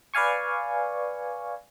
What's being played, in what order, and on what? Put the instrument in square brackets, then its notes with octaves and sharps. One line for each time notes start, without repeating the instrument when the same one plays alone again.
[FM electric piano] B4 D5 F5 G#5 C#6